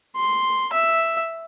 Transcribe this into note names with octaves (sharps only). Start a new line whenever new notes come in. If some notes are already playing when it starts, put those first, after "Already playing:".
C6
E5